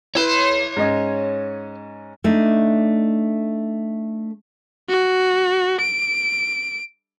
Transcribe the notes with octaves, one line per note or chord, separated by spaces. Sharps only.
E4 B4 C#5 C6
G#2 C#4 D#5
A3 D4 D#4
F#4
D7